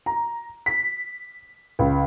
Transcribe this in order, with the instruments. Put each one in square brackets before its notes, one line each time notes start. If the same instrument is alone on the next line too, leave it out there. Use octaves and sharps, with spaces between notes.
[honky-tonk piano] A#5
B6
C#2